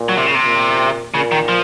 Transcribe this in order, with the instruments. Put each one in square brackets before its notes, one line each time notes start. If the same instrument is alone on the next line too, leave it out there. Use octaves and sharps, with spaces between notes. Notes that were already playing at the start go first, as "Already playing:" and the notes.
Already playing: [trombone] A#2
[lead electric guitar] F#3
C3
C#3
C3
[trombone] A#2
[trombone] A#2 [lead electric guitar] C#3
[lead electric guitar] D#3
F3